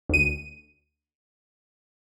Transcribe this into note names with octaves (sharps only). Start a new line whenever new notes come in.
D2 D#7